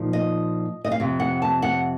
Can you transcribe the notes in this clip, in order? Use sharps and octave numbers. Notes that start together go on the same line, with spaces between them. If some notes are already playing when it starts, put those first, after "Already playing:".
Already playing: A#2 F3 D#4
D#5
D#5
F5
F2 C3
F#5
A5
F#5